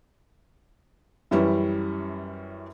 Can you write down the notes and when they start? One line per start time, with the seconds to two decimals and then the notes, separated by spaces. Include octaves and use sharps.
1.31 F#2 E3 G3 C#4 E4